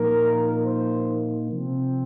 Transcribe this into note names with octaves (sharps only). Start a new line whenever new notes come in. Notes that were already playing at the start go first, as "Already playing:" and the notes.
Already playing: A#2 F3 A#3 D#4 A#4
C5
C3 F3 C4